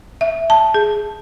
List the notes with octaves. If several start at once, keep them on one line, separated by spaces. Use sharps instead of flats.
E5
A5
G#4